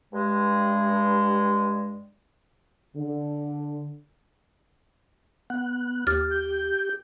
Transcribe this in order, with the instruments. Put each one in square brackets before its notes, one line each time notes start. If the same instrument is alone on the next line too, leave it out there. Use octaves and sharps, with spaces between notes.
[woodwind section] G2 G#3
[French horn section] D3
[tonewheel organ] B3 F#6
[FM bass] D#2 [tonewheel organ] G4 [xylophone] F6 A6
[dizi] G6